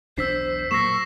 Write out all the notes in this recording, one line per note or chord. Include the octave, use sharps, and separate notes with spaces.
B1 E2 D4 C5 E6 B6 C7
A#2 F#3 A#3 C#6 E6 A#6 C7 E7